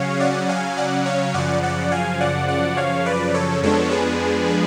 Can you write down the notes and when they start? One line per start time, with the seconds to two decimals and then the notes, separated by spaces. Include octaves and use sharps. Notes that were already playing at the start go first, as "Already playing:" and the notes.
Already playing: C#3 F#3 C#4 C#5 F5
0.20 D5 F#5
0.49 F5 G#5
0.77 D5 F#5
1.06 C#5 F5
1.34 F#2 C#3 F3 D5 F#5
1.63 D5 F#5
1.92 F5 G#5
2.21 D5 F#5
2.48 D5 F#5
2.77 C#5 F5
3.06 B4 D5
3.34 A4 C#5
3.62 F2 F3 G#3 B3 D4 A4 C#5
3.91 G#4 B4